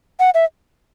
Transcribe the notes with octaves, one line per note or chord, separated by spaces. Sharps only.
F#5
E5